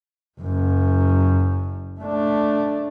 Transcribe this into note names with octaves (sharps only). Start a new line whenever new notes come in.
F#1 F#2
A3 D4